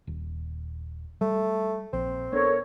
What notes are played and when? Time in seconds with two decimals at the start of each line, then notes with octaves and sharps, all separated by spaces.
0.07 D#1
1.21 G3 A3
1.93 A#1 C4
2.33 B3 D4 A4 A#4 C#5